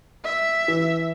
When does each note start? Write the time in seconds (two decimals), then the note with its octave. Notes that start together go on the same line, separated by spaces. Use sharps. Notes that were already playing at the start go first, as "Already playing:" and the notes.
0.24 E5
0.68 E3